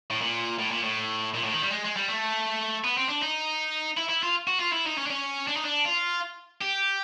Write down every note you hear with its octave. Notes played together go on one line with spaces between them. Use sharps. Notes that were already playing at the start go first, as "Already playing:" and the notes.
A2
A#2
A2
A#2
A2
A#2
A2
D#3
G3
G#3
G#3
G3
A3
B3
C4
D4
D#4
E4
E4
F4
F#4
F4
E4
D#4
C#4
D4
C#4
D4
D#4
D4
F4
G4